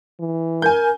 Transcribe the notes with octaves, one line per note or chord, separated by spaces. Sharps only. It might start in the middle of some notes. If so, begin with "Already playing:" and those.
E3
A#4 G#5 G6